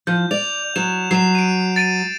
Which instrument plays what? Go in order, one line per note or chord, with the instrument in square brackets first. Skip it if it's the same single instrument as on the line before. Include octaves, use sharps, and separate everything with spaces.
[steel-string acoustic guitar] F3 [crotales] G6
[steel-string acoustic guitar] D5 [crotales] F7
[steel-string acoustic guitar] F#3 [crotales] E7
[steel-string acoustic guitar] F#3 [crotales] C7 E7
[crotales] D7 D#7
A6 D7 D#7